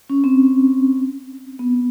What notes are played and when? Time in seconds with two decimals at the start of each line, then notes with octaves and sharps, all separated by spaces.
0.10 C#4
0.24 C4
1.59 B3